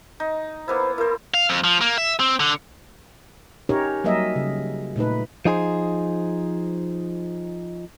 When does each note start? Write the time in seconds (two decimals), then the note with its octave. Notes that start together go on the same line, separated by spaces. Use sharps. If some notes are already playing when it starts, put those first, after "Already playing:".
0.20 D#4
0.68 A#3 B3 E4 C5
0.98 E4 A#4 C5
1.34 F5
1.50 F2
1.64 F3
1.81 A#3
1.98 E5
2.20 C4
2.40 D3
3.69 C#4 D#4 G4 A#4 C#5
4.04 F#3 G3 A#3 A#4 D#5 E5
4.36 C#3
4.96 A#2 A3 D#4 B4
5.45 F3 D#4 G#4 C5